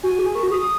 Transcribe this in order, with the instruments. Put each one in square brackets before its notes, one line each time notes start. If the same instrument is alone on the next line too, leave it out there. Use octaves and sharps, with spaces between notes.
[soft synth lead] F#4 [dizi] G#5
[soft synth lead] G#4
[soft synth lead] A#4 [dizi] C#6
[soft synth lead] F#4
[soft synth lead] G#4 [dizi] D#6